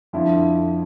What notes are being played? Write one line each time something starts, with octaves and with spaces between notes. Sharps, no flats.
F2 D3 F3 E4